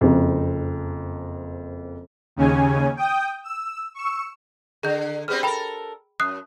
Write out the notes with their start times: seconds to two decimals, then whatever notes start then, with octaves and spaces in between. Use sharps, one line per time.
0.01 F#1 F2
2.36 D#2 C#3 C#4 G#5
2.97 G5 D#6 G6
3.44 E6
3.94 C#6 E6
4.83 D3 G#4 G6
5.28 G3 B3 C4 G#4 F6
5.43 A4 A#4 G5 B5 F7
6.20 F#2 D#6 F#6 C7